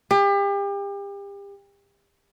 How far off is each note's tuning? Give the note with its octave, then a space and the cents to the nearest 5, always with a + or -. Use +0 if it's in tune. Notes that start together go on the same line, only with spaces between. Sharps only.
G4 +35